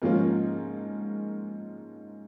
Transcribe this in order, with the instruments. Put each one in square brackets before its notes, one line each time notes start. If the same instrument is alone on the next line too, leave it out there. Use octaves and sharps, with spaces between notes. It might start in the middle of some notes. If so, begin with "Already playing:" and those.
[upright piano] G#2 F3 A#3 C#4 F4